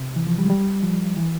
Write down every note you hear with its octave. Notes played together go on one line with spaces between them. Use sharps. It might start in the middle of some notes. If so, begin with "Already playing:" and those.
Already playing: C3
E3
F3
G3
G#3
G3
F3
E3